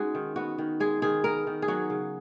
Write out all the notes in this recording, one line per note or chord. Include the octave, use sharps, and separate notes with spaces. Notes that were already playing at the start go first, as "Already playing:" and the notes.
Already playing: G#3 C#4 D#4 F#4 G#4
D#3
B3 F#4
D#3
G#3 G#4
D#3 G#4
B3 A#4
D#3
G#4
F#3 F#4
C#3